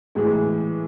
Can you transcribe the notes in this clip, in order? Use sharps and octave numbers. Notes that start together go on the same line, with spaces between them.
A2 E3 G#3 G#4